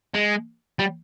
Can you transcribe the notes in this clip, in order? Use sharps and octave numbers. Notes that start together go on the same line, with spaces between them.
G#3
G3